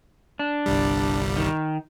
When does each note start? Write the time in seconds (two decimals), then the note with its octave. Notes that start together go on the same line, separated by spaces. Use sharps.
0.39 D4
0.66 G1 C2 G3
1.37 D#3